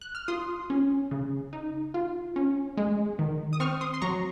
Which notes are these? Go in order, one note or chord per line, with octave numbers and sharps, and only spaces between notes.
F#6
F6
F4 C6 D#6
C#4
C#3
D#4
F4
C#4
G#3
D#3
D#6
C4 C#6 F6
C6 D#6
C6
F#3 A#5 C#6